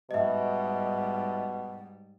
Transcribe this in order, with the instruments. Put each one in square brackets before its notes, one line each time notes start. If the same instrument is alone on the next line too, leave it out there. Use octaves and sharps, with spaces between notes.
[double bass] G#2 G3 [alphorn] B2 [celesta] D#5 E5